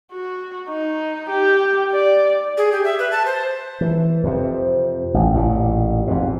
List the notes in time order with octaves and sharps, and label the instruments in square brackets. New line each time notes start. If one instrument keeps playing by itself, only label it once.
[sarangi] F#4
D#4
G4
D5
[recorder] G#4
G4
E5
B4
A5
C5
[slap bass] E3
F2 C3
A1
A1 A#2
F2 G#2 B2